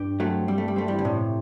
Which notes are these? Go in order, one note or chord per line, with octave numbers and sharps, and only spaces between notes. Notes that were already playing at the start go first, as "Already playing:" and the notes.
Already playing: G2 G4
F#3 A3 C4
G3 C4
A3
G3
A3 C4
E3 G3
D3
A2 C3